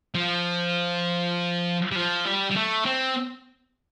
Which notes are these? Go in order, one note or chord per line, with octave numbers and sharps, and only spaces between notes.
F3
G3
F3
G3
G3
A3
C4